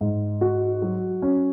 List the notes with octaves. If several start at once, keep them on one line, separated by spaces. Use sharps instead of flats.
G#2
F#4
F#3
C#4